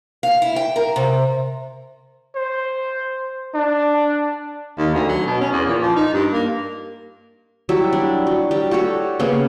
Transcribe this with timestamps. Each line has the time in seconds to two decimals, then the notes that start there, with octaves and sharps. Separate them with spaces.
0.23 F5
0.42 E4
0.56 G5
0.76 A#4
0.96 C3
2.35 C5
3.54 D4
4.78 D#2
4.94 D2
5.08 F#3
5.26 B2
5.40 C#4
5.52 E2
5.67 A#2
5.82 F3
5.96 D#4
6.13 G2
6.33 A#3
7.69 F#3 G3 E4 E5
7.93 D4
8.27 F#3
8.51 G3
8.71 F#4 G4 A4 C#5
9.20 C#3 A#3 B3